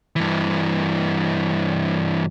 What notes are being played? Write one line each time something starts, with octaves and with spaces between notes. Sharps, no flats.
G2 E3